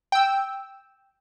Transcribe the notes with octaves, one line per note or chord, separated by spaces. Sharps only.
G5 E6